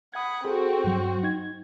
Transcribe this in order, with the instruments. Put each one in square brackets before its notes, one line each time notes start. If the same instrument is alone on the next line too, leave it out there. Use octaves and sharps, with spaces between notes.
[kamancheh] F#5 B5 [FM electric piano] D#6 G#6
[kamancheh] C4 F#4 [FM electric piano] G#4 A4
[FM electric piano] G2 F#3
D#4 G#6